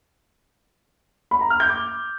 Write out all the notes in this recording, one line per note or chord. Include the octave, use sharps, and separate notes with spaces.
B5
A#5
F6
G6
D6